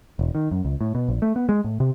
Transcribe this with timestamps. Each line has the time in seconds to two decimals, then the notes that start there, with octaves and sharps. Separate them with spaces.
0.19 E1
0.35 D#3
0.51 F#2
0.65 C#2
0.81 A2
0.95 B2
1.09 A#1
1.22 A3
1.36 B3
1.49 G#3
1.64 A2
1.80 C3